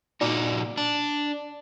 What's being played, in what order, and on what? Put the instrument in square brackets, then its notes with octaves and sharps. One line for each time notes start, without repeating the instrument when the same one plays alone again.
[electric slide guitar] A#2 D#4 F#4 [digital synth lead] D5
[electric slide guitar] D4